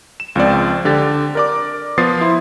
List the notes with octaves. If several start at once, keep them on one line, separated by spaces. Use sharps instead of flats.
E7
C#2 F3 C4 D5
D3 G4 A6
A#4 D5 D6
F3 B3 F4 D#6 A6 C7
E4 C6